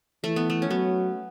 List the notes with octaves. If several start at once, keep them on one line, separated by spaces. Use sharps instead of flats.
E3 A3
B3
A3
C#4
F#3 B3